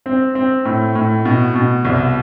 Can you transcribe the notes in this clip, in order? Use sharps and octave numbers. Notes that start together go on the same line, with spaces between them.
C4
C4
A2
A2
B2
B2
C2